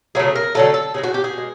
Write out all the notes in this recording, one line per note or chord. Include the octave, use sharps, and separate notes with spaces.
C#3 F#3 A3 G#4
A#4
D3 F#3 A3 A4
A4
C#3 E3 G#3 G#4
F#4
G4
G#4
B2 G#3